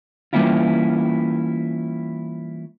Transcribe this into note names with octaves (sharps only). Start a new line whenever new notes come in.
E3 G3 A#3 C#4 E4 F4